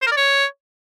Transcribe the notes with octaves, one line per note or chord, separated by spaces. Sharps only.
C5
A#4
D5
C#5